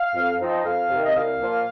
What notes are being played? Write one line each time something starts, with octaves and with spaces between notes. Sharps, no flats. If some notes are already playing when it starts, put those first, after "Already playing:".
Already playing: F5
F2
F3 C4 D#4
F2 F5
C3
D#3
D#5
C2 F5
A#2 F3 A#3 F4